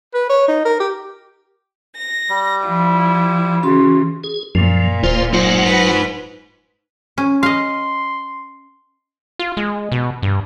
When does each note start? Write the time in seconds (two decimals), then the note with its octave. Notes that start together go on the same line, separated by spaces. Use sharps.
0.14 B4
0.30 C#5
0.48 D#4
0.65 A#4
0.80 G4
1.97 A#6
2.29 G3
2.65 F3 E4 F4
3.63 C#3 E3 C#4 F#4 C6
4.24 G#4
4.55 F#2 A#2 F3
5.04 D1 F4 C5
5.33 F#3 D#4 F4 C5 F#5
5.62 B4
7.18 C#4
7.43 D#5 F5 C6
9.39 F4
9.57 G#3
9.92 B2
10.22 G2